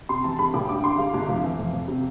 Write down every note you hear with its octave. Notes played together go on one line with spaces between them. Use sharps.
C3 C6
E3 A5
G3 B5
A1 D6
G2 D6
D3 C6
G3 F5
G1
F2
E3
F2
F2
C3